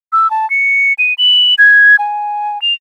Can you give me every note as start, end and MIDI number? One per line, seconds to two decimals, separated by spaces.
0.13 0.30 88
0.31 0.48 81
0.50 0.93 97
0.99 1.14 99
1.18 1.54 102
1.58 1.96 92
1.99 2.61 80
2.62 2.74 101